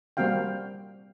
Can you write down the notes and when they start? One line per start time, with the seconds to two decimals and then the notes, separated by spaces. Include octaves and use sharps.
0.17 G3 A#3 C4 F#4 F5 G5